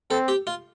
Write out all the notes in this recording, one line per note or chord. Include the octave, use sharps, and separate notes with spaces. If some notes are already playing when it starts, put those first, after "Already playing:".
C4 A4
G4
F4